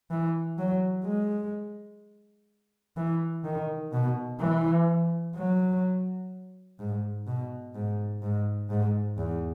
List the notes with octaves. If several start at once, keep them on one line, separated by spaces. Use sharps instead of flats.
E3
F#3
G#3
E3
D#3
B2
E3
F#3
G#2
B2
G#2
G#2
G#2
E2